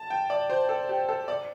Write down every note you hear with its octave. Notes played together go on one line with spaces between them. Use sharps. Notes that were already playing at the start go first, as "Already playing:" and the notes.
Already playing: A5
G5
D5
C5
A4
G4
A4
D5